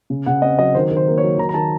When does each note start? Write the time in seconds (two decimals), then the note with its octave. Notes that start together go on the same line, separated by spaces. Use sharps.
0.10 C#3
0.26 C#3 F#5
0.42 C4 D#5
0.59 F#3 D#5
0.75 D#3 C5
0.91 D#3
0.97 C5
1.07 A#3
1.18 C#5
1.23 F#3
1.38 D#3 A#5
1.49 A#5
1.54 D#3 A5